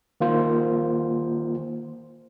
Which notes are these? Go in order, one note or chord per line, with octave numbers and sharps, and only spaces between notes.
D#3 A#3 F4 C5